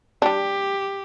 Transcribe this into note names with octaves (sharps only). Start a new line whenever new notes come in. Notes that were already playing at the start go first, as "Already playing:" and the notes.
G3 D4 G4